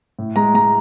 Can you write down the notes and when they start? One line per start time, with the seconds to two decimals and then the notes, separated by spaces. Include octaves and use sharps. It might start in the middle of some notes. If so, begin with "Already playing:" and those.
0.19 A2
0.36 G#3 A#5
0.54 G#3 A#5